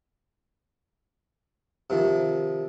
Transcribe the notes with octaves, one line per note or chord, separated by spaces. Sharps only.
C3 D#3 F3